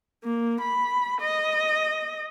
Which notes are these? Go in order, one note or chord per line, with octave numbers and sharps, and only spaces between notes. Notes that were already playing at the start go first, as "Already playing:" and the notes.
A#3
B5
D#5